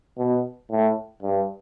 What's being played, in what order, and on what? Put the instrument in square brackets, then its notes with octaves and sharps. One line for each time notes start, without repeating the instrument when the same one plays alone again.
[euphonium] B2
A2
G2